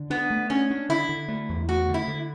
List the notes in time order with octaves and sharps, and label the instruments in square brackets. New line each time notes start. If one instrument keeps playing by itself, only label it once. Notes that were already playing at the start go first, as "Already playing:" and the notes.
Already playing: [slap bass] D3
[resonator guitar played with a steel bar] B3 [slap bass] D4
[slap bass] A3
[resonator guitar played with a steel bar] C#4 [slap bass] D4
[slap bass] D4
[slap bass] D3 [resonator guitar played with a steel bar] E4
[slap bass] D3
A3
E2
[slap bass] A3 [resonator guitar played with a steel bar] F#4
[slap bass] D3
[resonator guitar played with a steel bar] E4
[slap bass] D3